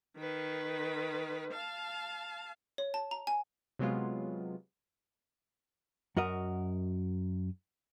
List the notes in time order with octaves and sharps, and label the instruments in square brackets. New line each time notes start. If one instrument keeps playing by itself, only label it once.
[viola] D#3 B4
F5 A5
[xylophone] C#5
A5
A#5
G#5
[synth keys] C3 F#3 G#3 B3 F4
[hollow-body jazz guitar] F#2 F#4 A#4 D#5